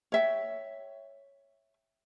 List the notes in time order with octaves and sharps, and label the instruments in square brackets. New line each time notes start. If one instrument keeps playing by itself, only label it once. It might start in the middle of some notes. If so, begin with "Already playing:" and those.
[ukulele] C#5 E5 G5